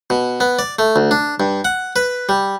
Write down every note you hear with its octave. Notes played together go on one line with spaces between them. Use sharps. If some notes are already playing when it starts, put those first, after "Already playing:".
B2
B3
D5
A3
D2
D4
G2
F#5
B4
G3